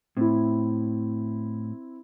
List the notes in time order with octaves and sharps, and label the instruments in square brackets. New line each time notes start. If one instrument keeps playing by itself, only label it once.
[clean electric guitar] A2 [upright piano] C4 E4